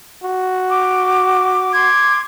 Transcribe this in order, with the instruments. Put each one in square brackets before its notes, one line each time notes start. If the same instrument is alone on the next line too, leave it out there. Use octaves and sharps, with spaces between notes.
[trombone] F#4
[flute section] D6
C6 D6 G#6